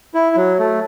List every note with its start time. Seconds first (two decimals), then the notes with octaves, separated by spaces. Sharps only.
0.14 E4
0.36 F#3
0.59 A3